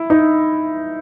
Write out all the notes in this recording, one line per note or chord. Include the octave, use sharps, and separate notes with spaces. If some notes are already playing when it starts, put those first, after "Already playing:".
Already playing: E4
D#4